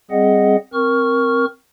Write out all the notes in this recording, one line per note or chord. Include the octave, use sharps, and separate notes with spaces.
G3 C4 G#4 D#5 F#5
C4 A#4 C#6 F6